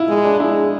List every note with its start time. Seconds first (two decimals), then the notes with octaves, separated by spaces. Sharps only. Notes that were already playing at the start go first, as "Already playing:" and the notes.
Already playing: E4 F4
0.08 G#3
0.24 D4
0.40 G#3 E4